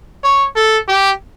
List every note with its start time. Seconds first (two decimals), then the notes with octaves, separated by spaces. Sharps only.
0.23 C#5
0.55 A4
0.88 G4